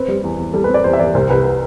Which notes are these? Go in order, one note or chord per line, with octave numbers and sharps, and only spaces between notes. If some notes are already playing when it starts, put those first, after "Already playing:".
Already playing: C4 B4
G3
E2
E2
G3 A4
C4 B4
D5
E2 C5
E5
E2 D5
C2 C5
C2 B4
B4